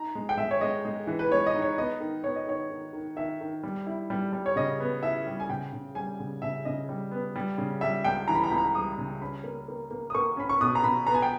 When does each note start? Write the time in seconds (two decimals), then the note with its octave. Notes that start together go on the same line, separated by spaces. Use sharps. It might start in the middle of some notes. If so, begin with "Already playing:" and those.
Already playing: D#4 A#5
0.15 G#3
0.29 G5
0.37 G#3 E5
0.51 C#5
0.61 G#3 D#5
0.85 G#3
1.07 E3
1.19 B4
1.31 G#3 C#5
1.46 D#5
1.54 D#4
1.62 C#5
1.78 B3 D#5
2.00 D#3
2.24 B3 C#5
2.36 D#5
2.47 D#3 C#5
2.71 D#3
2.93 D#3
3.16 D#3 E5
3.41 D#3
3.63 G3
3.87 E4
4.10 G3
4.33 G3
4.46 C#5
4.56 C#3 D#5
4.80 B3
5.03 E4 E5
5.27 G3
5.40 G#5
5.49 C#3 G5
5.73 C#3
5.95 G3 G#5
6.20 C#3
6.42 C#3 E5
6.65 C#3 D#5
6.89 G3
7.11 B3
7.36 G3
7.58 C#3
7.81 G3 E5
8.05 C#2 G5
8.28 E3 A#5
8.35 B5
8.43 A#5
8.50 C#2 B5
8.58 A#5
8.75 G3 D#6
8.98 C#3
9.21 C#4 B5
9.44 A#3
9.68 A#3
9.91 A#3
10.10 D#6
10.15 A#3 C#6
10.37 C#4 B5
10.49 C#6
10.61 B2 D#6
10.75 A#5
10.84 B2 B5
11.07 B3 A#5
11.14 G#5
11.22 G5